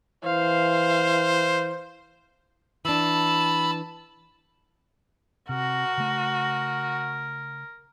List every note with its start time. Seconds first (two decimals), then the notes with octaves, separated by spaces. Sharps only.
0.24 E3 C5 F5
2.85 E3 D4 A5 B5 E6
5.49 C3 F#4 A#4
5.98 C#3 A3